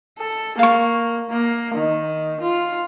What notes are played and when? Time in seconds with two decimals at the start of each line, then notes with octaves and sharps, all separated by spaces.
0.19 A4
0.59 A#3 F5 C#6
1.30 A#3
1.75 D#3
2.41 F4